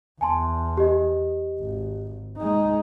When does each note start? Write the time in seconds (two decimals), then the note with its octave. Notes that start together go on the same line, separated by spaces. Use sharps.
0.21 E2 G#5 A5 C6
0.77 G4 D#5
1.59 G#1
2.37 G#3 D#4